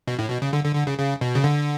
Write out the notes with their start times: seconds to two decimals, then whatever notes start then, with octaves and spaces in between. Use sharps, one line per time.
0.07 B2
0.19 A2
0.30 B2
0.42 C#3
0.53 D3
0.64 D3
0.75 D3
0.87 C#3
0.98 C#3
1.21 B2
1.35 C#3
1.44 D3